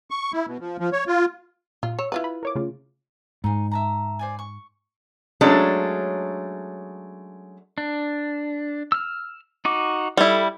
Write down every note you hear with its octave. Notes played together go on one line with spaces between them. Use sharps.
C#6
E4
B2
F3
F3
C#5
F4
A#2 F4
C#5 E6
E4 F4 B4
B5
A#4 C#5 D6
C#3 A3 F4
G#2 D#4 G#4
E5 A5 A#5
C5 D5 G#5
C#6
F#3 G#3 A3 C#4 D4
D4
E6 F6
D#4 F#4 D6
G3 E4 A4